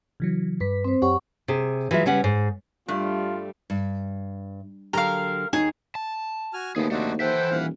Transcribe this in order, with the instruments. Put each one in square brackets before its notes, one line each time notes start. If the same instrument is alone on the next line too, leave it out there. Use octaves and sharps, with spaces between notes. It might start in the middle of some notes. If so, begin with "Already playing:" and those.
[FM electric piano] C#3 E3 F#3
[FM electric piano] G2 B6 [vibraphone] B4
[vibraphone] C4 C5
[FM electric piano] F#2 G4 C#5 [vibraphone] F#5 C#6
[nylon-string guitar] C3 G#4
E3 F#3 G#3 F4 E5
C#3 G3 C#4 B4 F#5
G#2
[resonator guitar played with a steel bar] G2 A3 [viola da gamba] G3 [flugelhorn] F4
[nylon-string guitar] G2
[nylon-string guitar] D3 F#3 G4 [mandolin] A#4 F5
[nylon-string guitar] D#2 C#5 [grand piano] D#4 [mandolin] G#4
[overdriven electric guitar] A5
[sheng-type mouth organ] F#4 G#5 F6
[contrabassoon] D#2 [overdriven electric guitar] A3 G#4 [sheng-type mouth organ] B3
[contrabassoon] D#2 [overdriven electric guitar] A3 C4 [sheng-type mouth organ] D4 D#4 F#4
[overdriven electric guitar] E3 E5 [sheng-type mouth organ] A4 F#5 G5 [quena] C5
[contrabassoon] D#1 [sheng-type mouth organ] F5 F#5